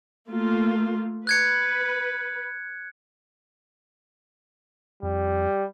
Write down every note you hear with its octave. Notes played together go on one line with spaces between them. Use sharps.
A3 A#3 F4
B4 F#6 G#6 C#7
F2 G3